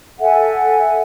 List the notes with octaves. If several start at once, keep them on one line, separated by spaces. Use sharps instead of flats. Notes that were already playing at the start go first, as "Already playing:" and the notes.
A4 E5 F#5 G#5